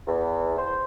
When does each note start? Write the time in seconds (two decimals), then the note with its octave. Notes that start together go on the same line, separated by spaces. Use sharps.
0.07 E2
0.58 C5